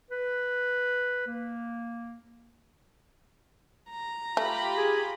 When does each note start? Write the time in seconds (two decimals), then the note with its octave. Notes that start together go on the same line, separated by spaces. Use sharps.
0.11 B4
1.27 A#3
3.90 A#5
4.37 A3 F4 G4 B5
4.77 G#4